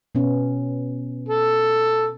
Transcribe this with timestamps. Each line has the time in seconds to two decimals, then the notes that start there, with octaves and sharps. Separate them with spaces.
0.15 B2 B3 C#4
1.29 A4